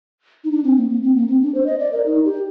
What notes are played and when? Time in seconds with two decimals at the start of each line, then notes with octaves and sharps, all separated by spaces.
0.44 D#4
0.52 D4
0.64 C4
0.77 A#3
0.90 A#3
1.03 C4
1.15 A#3
1.28 C4
1.42 D4
1.55 C5
1.66 D#5
1.79 D5
1.92 A#4
2.06 D#4
2.25 G4